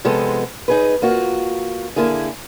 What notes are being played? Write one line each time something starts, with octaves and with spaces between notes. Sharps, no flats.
C3 F3 G#3 B3 A4
D#4 G#4 B4
A#3 F4 F#4
D3 A#3 E4 G#4